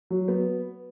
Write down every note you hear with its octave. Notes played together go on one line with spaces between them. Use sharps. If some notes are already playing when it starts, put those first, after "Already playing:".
F#3
B3